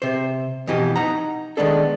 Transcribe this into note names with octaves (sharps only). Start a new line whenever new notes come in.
C3 C5
F2 B2 E3 G4 D#5
D#4 F#5 A#5
D#3 E3 G#3 B3 D4 A4